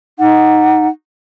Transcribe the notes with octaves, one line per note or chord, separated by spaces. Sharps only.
D#4 F#5